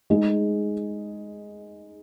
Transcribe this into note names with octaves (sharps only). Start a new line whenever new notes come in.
G#3 D#4 G#4